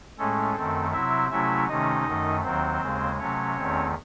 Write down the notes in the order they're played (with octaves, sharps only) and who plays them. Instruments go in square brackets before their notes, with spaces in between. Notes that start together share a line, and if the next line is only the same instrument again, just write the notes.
[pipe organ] A2 G#3 A3 C#4 A4
F#2 D#3 A3 C4
C3 F#3 C4 E4 E5
C3 F#3 A3 C#4 E4 E5
C3 D#3 A3 C#4 D#4 D#5
F#2 D#3 A3
D#2 D#3 F#3 C4 C5
D#2 C#3 G#3
C3 F#3 A3 C#4 C#5
E2 D#3 A3 C4